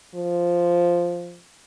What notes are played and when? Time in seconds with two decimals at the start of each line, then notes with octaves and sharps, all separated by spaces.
0.15 F3